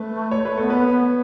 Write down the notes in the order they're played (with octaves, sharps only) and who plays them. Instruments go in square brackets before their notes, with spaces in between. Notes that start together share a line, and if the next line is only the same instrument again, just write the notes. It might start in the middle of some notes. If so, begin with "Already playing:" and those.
Already playing: [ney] A3 [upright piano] B4
[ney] A3 [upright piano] C#5
[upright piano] B4
[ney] B3 [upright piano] A4
[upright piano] B4
[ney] B3